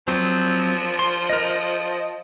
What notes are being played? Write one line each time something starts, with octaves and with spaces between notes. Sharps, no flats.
F3 F#3 C4
C6
A#4 D#5
D#5